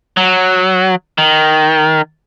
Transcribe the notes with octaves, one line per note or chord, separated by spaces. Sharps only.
F#3
D#3